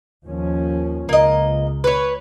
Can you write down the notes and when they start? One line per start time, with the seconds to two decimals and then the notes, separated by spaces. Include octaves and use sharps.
0.25 D#2 F3 C#4
1.09 C#2 A#3 D#5
1.84 B4 C#5